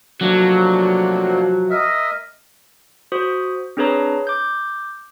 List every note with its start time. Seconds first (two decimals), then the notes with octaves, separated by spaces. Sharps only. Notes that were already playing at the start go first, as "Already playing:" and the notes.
0.21 C3 F3 F#3 A3 A#3 D4 F#4
1.70 A#4 D#5 E5
3.12 F#4 C5 D#6
3.77 C4 D4 G#4 B4 C#5 A#5
4.27 D6 G6